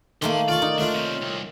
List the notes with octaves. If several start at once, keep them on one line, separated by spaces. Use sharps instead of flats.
D#3 A3 A#3 A4 C6 D6
F4 D5 C#6
D#4
A3 C#4 D4 F4
C3 G3
C2